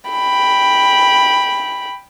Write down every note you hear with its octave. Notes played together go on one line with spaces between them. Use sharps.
G5 B5